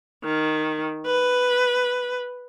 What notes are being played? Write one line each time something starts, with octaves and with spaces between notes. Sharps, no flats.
D#3
B4